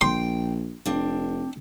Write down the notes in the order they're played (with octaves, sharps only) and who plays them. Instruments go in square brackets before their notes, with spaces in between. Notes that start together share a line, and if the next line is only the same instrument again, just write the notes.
[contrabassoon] A#1 [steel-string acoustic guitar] G5 [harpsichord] C6
[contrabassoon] F1 [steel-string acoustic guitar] C4 D4